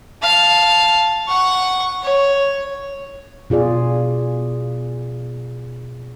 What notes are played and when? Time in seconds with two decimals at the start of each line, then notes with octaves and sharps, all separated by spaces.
0.22 F5 A5
1.28 F#5 C#6
2.03 C#5
3.50 B2 F4 G#4 D5